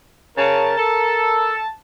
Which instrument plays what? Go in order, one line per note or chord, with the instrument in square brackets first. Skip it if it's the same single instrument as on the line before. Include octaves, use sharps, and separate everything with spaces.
[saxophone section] C#3 C#4 [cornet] A#4 [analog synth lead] A5
[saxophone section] A4 [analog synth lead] A5